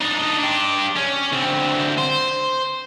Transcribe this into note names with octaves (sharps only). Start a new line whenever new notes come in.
D4 D#4
D4 G4
C#4
D2 C4
C5